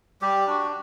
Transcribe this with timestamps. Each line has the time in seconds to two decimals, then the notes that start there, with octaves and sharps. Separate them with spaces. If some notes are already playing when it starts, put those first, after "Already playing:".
0.22 G3 G4
0.47 D4 F#4